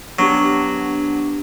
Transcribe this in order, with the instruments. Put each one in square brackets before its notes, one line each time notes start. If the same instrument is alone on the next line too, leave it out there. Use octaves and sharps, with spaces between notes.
[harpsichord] F#3 [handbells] B3 D4 G4